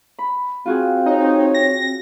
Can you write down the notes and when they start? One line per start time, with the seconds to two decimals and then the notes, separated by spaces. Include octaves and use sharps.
0.19 B5
0.66 C4 F4 F#4 G#4
1.06 D#4 C#5
1.54 A#6